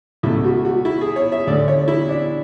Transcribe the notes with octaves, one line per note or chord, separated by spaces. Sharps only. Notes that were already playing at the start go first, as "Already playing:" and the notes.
C#2 B2 A3 E4
F#4
F#4
E4
G#4
C#5
E5
D2 D3 A3 D5
C#5
E4
D4